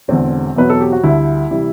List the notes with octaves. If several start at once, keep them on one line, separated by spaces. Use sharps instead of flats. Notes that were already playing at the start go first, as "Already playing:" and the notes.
E1 E2 D3 C4
E2 B2 F#3 B4
A4
G4
F#4
D2 D3 G3 E4
C3 E3 G3